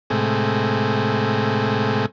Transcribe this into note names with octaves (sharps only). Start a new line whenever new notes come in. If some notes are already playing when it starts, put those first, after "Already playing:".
A2 C3 G#3